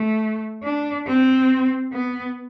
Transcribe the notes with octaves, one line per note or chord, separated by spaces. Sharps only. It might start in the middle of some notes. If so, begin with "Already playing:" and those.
Already playing: A3
D4
C4
B3